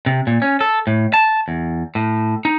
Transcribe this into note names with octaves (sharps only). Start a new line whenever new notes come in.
C3
A#2
C#4
A4
A2
A5
E2
A2
D#4